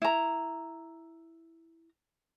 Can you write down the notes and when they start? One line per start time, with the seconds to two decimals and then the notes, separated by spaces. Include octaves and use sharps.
0.02 E4 A#5